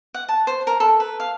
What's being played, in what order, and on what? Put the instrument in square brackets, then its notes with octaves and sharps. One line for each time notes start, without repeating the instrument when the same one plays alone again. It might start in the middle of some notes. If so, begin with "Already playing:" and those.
[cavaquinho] F#5
A5
C5
A#4
A4
B4
F5